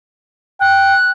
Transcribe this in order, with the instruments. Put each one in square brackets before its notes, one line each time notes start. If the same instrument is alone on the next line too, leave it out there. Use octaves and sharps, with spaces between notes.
[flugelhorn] G5 [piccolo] F#6